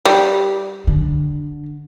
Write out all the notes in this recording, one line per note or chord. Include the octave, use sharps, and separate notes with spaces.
G3
D3